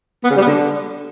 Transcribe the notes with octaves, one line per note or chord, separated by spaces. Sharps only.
B3
C#3
G3
B3
D3